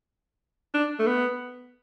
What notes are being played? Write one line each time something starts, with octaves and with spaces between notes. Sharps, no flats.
D4
A3
B3